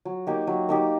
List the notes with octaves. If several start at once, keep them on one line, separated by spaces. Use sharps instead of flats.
F#3
A#3 D#4 G4
F#3
A#3 D#4 G4